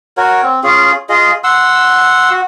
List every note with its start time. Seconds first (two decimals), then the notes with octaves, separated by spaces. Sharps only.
0.17 F#4 A#4 C#5
0.43 C4
0.64 C#4 F4 G#4
1.09 F4 G#4 D#5
1.44 F#5 C6 E6
2.31 F#4